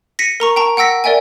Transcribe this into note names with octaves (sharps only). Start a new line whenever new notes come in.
A#6 B6 C#7 D#7
A#4 A#5 C#6
G5 A5 A#5 C#6
F#5 G5 E6 A#6 B6
A#4 D5 E5 G5 G#5